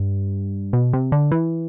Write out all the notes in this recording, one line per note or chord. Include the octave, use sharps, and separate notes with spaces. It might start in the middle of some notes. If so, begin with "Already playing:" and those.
Already playing: G2
B2
C3
D3
E3